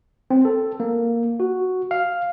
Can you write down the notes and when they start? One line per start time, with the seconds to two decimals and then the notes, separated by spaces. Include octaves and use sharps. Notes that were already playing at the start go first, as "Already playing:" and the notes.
0.30 C4
0.45 A4
0.80 A#3
1.40 F#4
1.91 F5